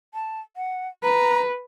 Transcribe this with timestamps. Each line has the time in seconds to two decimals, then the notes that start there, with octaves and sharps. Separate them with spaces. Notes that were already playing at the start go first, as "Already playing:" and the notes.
0.14 A5
0.56 F#5
1.03 B4 A#5